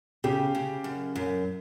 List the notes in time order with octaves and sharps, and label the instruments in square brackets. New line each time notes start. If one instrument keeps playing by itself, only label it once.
[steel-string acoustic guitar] C#3 [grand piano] G4
[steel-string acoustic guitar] C#3
F#2
F#2